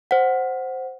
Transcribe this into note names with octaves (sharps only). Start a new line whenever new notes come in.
C5 F#5